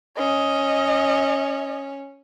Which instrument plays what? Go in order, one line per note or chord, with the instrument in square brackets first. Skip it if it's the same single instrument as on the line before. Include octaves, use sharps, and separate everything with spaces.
[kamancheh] C#4 [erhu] D#5